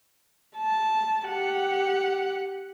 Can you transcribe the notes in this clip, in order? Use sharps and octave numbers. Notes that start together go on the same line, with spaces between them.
A5
G4 F#5